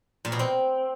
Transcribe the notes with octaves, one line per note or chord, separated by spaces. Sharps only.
A#2
B2
C4